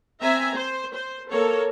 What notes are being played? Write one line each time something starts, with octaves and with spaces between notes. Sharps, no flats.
C4 E5 G#5 A#5
C5
C5
A#3 A4 A#4 C#5